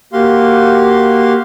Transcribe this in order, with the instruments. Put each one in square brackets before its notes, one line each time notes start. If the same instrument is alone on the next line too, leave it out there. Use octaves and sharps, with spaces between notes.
[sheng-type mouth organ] A#3 F#4 G4 F5 C6